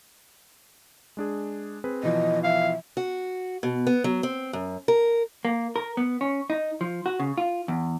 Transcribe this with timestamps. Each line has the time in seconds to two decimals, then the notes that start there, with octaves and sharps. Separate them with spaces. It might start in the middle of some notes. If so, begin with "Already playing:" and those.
1.17 G#3 D4 G#4
1.84 C4 G#4 B4
2.03 B2 E3 F3 D#5
2.44 E5 F5
2.97 F#4
3.63 B2
3.87 B3
4.04 F#3
4.23 C4
4.53 F#2
4.88 A#4
5.45 A#3
5.76 A#4
5.97 B3
6.21 C#4
6.50 D#4
6.81 F3
7.06 F#4
7.20 C#3
7.38 F4
7.68 E2